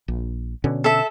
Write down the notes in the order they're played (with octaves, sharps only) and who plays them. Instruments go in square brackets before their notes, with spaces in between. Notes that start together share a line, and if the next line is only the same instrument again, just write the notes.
[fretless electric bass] A#1
B2 D3 C#4
[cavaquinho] A4 E5